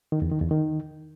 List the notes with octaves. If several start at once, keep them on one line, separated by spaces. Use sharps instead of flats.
D#3
E2
D#3
E2
D#3